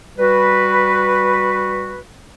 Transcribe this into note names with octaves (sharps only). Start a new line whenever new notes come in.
G3 F#4 B4